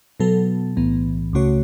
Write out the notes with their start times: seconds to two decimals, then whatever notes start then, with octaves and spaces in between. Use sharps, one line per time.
0.20 B2 F#3 B3 A4
0.77 B1 A2 E3 B3
1.33 C#2 C#3 A3 F#4 C#5